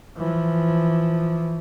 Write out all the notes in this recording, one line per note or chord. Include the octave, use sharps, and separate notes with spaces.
E3 F3